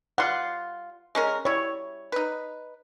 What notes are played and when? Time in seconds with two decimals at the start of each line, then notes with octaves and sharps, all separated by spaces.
0.18 G3 F4 F#5 C6
1.15 G#3 C#4 A#4
1.45 G3 E4 C#5
2.12 D#4 B4